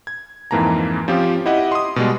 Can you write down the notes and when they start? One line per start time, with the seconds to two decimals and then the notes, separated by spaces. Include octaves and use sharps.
0.07 G#6
0.51 F2 G#2 E3 A#3 A5 A#5
1.08 F3 C4 C#4 F4 G4
1.46 E4 G4 D#5 F#5
1.72 C6 D#6
1.96 B2 G3 G#3